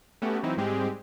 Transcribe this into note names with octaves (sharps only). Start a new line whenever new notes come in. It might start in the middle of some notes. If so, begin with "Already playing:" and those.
A3 B3 C#4 F#4 G4
E3 F#3 C4 D#4 E4
G#2 G3 G#3 C4 G4 G#4